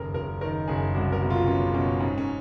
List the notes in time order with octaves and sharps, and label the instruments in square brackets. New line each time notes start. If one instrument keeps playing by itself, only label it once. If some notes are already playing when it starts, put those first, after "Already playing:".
Already playing: [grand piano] F#1 D#2 A#4
F#1 A#4
D#3 A#4
F#1 G#4
C2 F#4
A#4
B2
F4
B2 C#4
B2 C#4
G#2 C#4
C#4